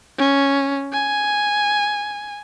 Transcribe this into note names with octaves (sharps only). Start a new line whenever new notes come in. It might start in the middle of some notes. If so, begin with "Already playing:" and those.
C#4
G#5